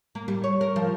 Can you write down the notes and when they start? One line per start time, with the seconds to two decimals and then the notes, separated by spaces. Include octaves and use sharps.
0.15 A#3
0.28 G3
0.44 C#5
0.61 A#4
0.76 F3